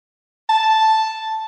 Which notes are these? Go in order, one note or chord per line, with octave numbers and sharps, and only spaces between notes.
A5